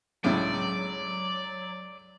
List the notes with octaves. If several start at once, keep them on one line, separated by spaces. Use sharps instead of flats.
C#2 A2 C#3 F#3 D5